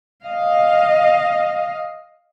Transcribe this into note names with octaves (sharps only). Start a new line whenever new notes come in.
D#5 F5